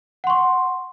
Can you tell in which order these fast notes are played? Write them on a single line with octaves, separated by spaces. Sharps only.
F#5 C6 C#6